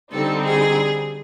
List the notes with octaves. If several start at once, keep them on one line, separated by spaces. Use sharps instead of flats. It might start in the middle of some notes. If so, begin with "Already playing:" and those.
D3 G3 C4 D#4 A4
G#4